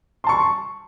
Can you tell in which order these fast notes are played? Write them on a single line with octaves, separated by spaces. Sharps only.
C6 A5 C#6